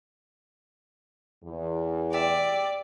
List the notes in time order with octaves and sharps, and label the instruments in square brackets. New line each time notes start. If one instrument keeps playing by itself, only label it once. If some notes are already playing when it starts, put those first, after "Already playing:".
[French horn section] E2
[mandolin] G4 E5 [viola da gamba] D5